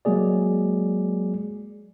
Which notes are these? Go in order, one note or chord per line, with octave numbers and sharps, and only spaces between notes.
F#3 G#3 A#3 G#4 D5